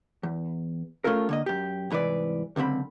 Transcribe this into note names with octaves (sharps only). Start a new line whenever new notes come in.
E2
A3 C#4 F4 A4 A#4
D3 A#3 D#5
F#2 G4
C2 G#2 E3 B4 D5
C#2 F#2 D3 C4 B5